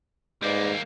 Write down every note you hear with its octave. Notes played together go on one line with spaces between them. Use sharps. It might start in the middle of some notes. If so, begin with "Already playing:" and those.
G#2 G3 G#3 A#3 B4 D5